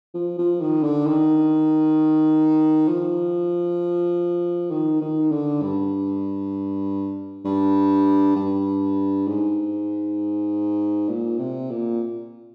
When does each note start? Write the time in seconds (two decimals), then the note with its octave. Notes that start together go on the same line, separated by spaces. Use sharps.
0.15 F3
0.38 F3
0.61 D#3
0.83 D3
1.07 D#3
2.88 F3
4.71 D#3
5.01 D#3
5.32 D3
5.63 G2
7.45 G2
8.36 G2
9.27 G#2
11.09 A#2
11.39 C3
11.70 A#2